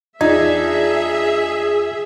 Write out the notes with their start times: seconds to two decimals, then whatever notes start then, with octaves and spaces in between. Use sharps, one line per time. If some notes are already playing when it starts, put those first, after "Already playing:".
0.21 E2 D4 D#4 F4 G#4 E5 G#6